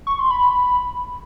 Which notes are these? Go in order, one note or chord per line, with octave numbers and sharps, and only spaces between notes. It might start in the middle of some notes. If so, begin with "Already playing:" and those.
C#6
C6
B5